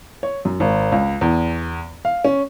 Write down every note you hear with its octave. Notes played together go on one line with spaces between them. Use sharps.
C#5
F#2
G#1
C#2
E2
F5
C#4